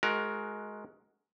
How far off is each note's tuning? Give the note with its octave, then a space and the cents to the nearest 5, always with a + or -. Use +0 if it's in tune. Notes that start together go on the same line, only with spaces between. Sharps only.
G#3 +20 F#4 +0 A#4 +10